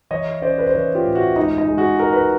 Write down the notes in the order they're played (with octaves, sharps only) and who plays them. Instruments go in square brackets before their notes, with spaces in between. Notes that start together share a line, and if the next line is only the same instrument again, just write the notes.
[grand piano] E3 C#5 D#5
C#4 C5 D5
B4
C5
E3 B4 C#5
F4 G4
A2
E4 F#4
G#3 D#4
D#4
G#3
F#4 G#4
G#3 A#4
B4